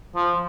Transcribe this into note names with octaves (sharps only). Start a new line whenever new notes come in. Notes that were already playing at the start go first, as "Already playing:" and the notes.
F3